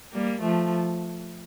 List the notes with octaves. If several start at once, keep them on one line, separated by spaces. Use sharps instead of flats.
G3 A#3
F3 A3